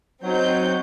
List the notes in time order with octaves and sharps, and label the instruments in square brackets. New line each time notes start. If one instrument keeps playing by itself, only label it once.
[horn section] F#3 [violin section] C4 D#4 G6